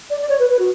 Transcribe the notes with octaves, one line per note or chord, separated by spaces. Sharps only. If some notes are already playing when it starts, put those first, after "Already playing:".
D5
D5
C#5
B4
B4
F#4